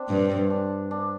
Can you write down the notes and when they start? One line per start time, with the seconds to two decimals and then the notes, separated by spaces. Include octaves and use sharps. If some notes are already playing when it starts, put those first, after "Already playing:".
Already playing: C4 D4
0.09 G2
0.50 D4
0.91 D4